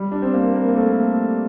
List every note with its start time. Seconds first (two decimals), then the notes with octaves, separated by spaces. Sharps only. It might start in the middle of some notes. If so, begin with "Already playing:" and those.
Already playing: G3
0.12 D4
0.22 C4
0.34 A#3
0.55 A#3
0.68 A#3
0.76 A3